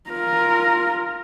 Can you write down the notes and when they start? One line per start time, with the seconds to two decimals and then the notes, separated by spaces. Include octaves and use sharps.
0.10 F4 A#4